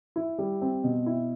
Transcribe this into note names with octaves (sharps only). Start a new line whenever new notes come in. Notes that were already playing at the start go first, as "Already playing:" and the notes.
E4
G3
C4
B2
E4